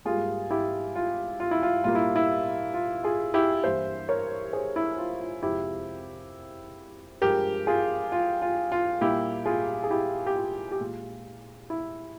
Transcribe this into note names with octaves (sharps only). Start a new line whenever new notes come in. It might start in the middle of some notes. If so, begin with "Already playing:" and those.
G#2 G3 A#3 F4 G#4
E4 G4
F4
F4
E4
F4
A#2 G3 A#3 F4
E4
E4
F4
F4 G#4
E4 G4
G2 E3 A#3 C5 E5
A#4 C#5
G#4 C5
E4
F4
F4
F2 C3 F3 G#3 E4 G4
G2 F3 G#3 G4 A#4
F4 G#4
F4
F4
F4
A#2 G3 A#3 E4 G4
F4 G#4
G#4
E4 G4
G4
F4
G4
A#2 G#3 F4
E4